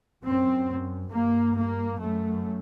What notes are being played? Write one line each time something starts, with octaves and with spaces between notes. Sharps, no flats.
F#2 C4
G2 A#3
A#3
F#2 A3